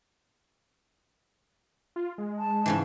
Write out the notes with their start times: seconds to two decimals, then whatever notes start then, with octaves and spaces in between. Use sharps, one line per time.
1.96 F4
2.18 G#3
2.38 A5
2.66 G#2 C#3 E3